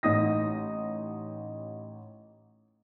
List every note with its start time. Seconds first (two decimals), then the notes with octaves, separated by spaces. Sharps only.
0.03 A1 D#4 D#6 A#6